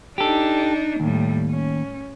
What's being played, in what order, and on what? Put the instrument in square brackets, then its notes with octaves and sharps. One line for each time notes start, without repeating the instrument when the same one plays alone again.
[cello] D4 D#4 [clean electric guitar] G4 A4
[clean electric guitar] D#2 [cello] A2 G3
[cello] C#4